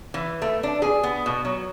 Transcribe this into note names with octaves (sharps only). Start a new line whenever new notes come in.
E3
A3
D4
G#4
B3
B2
F#3